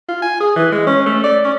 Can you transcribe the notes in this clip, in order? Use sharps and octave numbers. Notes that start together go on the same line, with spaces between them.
F4
G#5
G#4
E3
G#3
C#4
A3
D5
C#4